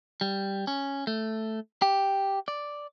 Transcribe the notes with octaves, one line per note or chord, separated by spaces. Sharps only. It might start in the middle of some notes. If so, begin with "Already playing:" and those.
G3
C#4
A3
G4
D5